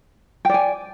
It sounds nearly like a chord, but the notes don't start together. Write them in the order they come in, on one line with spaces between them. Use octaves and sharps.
G5 D5 G#5